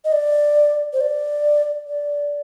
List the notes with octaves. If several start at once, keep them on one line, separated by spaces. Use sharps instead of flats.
D#5
D5
C5
D5
D5